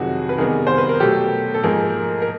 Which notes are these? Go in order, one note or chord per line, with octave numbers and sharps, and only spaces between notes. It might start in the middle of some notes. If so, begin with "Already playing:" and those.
Already playing: F2 C3 D#3 F#3 F#4 G#4
B4
C3 D#3 G3 B3 G#4 A#4
C5
B4
A#4
B2 F#3 A3 G4 A4
A4
G#2 F3 A#3 G#4 A#4
A#4